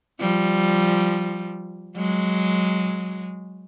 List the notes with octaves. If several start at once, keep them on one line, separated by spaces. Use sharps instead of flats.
F3 G3
F#3 G#3